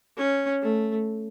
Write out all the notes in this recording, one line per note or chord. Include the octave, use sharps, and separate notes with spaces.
C#4
A3